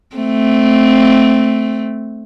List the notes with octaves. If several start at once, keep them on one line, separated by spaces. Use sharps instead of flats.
A3 C4